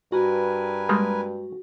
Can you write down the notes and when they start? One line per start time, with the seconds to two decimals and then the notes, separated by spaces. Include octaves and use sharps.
0.12 G2 F#4 A#4 B4 G#5
0.89 G3 G#3 A#3